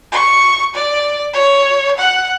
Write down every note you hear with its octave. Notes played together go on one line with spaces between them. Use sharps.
C#6
D5
C#5
F#5